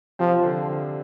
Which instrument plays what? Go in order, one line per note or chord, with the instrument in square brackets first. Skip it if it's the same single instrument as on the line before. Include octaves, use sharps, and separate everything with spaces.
[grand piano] C3 C4 [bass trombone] F3
[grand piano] D3 D4